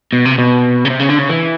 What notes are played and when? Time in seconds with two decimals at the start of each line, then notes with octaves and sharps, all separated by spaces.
0.13 B2
0.25 C3
0.38 B2
0.85 C#3
0.90 C3
1.00 C#3
1.10 D3
1.19 C#3
1.29 E3